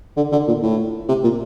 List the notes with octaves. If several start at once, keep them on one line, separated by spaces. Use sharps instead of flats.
D3
D3
A#2
A2
C3
A#2